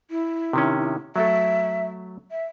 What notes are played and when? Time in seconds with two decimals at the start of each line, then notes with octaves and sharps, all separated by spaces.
0.10 E4
0.53 C3 D#3 C#4
1.16 F#3 A3 A4 E5
2.31 E5